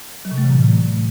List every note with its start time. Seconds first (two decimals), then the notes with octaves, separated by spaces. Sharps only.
0.25 F#3
0.31 C3
0.38 A3
0.44 E3
0.50 A2